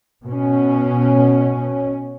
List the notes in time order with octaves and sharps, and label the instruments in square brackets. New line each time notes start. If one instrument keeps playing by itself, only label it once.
[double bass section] B2 C#4